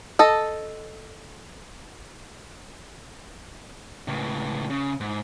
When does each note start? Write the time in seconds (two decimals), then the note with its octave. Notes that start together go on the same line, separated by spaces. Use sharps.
0.19 A4 D#5
4.08 C#2 A2
4.70 C#3
5.01 G#2